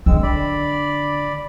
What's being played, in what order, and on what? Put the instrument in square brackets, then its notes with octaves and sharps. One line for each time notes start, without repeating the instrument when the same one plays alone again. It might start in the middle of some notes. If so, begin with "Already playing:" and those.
[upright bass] D3 [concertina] G#3 C4 E6
[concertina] D5 B5